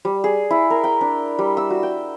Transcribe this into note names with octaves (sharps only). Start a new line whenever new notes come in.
G3
G#4
E4
A#4
G5
D4
G3
E6
F#4
G5